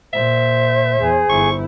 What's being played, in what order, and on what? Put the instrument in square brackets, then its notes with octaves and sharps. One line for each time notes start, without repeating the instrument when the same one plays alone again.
[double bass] A#2 [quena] C5 [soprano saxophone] E5
[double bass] E2 [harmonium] G#4
[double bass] G1 E4 [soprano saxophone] C#6